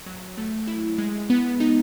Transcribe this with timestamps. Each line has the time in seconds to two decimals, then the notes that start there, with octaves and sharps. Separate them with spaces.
0.06 F#3
0.38 A3
0.67 E4
0.98 G#3
1.30 B3
1.60 D#4